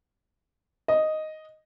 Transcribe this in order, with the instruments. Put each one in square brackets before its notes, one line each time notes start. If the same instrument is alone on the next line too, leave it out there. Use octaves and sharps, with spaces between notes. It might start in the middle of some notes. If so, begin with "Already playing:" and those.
[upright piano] D#5